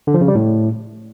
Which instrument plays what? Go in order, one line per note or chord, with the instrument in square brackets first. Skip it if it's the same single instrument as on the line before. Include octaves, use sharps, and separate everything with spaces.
[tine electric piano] D3
F3
C#3
G3
A2